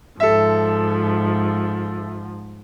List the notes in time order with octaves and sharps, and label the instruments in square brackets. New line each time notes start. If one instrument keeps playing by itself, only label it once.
[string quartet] G#2 F3 [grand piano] A4 E5